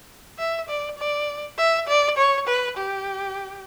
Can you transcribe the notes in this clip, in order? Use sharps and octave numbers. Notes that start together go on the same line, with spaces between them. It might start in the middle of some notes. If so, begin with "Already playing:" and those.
E5
D5
D5
E5
D5
C#5
B4
G4